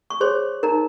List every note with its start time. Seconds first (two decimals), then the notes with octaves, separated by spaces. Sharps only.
0.10 C#6
0.20 G#4 C5 C#5 C6
0.63 D#4 A#4 A#5